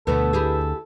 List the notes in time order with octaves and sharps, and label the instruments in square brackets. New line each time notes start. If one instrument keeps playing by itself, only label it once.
[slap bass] D2 [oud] B2 A3 B3 [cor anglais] A4 [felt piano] B4
[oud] E4 G4 G#4